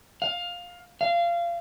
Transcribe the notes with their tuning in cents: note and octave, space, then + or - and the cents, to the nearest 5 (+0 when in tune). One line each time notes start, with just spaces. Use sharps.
F5 +15
F5 -25